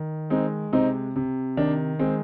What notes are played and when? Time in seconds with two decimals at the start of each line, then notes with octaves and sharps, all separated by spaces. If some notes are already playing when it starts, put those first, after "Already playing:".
Already playing: D#3
0.30 G#3 C4 D#4
0.72 C3 C4 D#4
1.16 C3
1.57 D#3 D4
1.99 G#3 C4